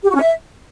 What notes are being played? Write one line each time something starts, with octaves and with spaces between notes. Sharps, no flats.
G4
F#4
C#4
E5